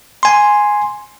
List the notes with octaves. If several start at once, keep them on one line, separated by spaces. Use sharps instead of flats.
G#5 C6